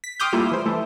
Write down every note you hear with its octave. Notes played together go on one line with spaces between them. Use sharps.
B6
G5 C6 D6 D#6 F6 G6
G3 A3 A#3 E4 F4 G4
E3 C5
E3 A3 E4 A4